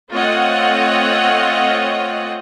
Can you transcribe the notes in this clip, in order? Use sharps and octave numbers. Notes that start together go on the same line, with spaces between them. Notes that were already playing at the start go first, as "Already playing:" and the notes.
A3 C4 F4 C#5 D#5 F#5